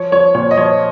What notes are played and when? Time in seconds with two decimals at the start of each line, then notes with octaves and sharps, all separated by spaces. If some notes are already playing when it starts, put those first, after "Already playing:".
Already playing: F3 C#5
0.12 F3 C#5
0.35 A#2 C#5
0.51 D#5
0.57 F3 C#5